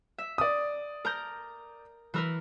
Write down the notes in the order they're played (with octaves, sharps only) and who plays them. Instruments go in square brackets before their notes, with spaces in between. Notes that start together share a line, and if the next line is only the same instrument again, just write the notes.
[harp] E5
[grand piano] D5 D#6
[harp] A#4 A#5 G6
E3 A#4 B4